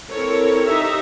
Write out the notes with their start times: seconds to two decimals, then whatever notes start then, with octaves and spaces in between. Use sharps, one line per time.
0.12 C4 E4 A4 A#4 C#5
0.69 D#4 G4 E5 A#5